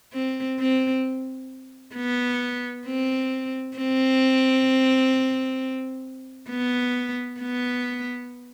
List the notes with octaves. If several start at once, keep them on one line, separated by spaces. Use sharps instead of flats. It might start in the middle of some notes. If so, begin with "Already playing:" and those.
C4
C4
B3
C4
C4
B3
B3